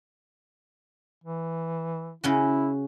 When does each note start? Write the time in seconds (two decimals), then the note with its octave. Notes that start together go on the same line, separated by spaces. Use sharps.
1.24 E3
2.24 C#3 C#4 E4 F#4